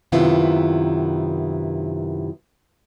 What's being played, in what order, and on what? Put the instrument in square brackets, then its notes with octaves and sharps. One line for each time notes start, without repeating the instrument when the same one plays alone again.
[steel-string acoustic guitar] F#2 C3 D#3 B3 E4 F4